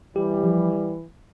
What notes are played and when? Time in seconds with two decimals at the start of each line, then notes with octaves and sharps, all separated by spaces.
0.16 E3 G3 G4
0.44 F3